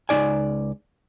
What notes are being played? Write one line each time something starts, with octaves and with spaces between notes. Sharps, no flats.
C#2 F#3 D#4 D5 G#5